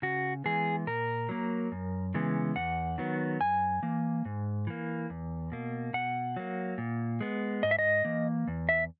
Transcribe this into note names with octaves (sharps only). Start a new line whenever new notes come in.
C#3 F#4
E3 G#3 B3 G#4
A#2 A#4
F#3 A#3
F#2
C#3 E3 G#3 B3
E2 F#5
D#3 F#3 B3
F#2 G#5
E3 A#3
G#2
E3 A#3
E2
B2 A#3
B2 F#5
F#3 A#3
A#2
G#3 B3
G#2 D#5
E5
D#5
E3 A#3
E2
E5